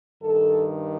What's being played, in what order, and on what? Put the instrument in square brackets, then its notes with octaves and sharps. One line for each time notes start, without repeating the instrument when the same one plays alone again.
[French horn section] G2 D#3 A4